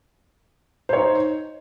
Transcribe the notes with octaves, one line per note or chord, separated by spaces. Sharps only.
D#4 C5 C#5